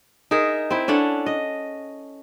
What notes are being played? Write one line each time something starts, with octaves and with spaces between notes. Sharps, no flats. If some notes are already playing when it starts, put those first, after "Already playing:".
D#4 G#4 A#4 E5
C4 E4
C#4 D4 A4 F#5
D#5